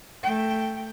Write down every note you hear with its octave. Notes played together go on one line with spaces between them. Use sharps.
A3 G5